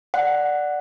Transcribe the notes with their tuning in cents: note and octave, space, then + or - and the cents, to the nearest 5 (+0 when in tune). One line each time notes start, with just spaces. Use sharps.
D5 +0 F#5 +0